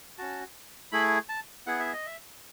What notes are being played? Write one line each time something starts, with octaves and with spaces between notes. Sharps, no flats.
C#4 F#4 A5
A3 E4 G#4 B5
A5
B3 E4 G#4 F#5
E5
D#5
E5